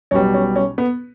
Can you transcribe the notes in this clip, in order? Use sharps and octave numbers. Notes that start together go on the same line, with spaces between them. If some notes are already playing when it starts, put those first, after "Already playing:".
B1 B2 G3 C#4
C#4
C#4
B3